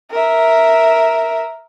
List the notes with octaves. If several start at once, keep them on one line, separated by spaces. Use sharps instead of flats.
A#4 E5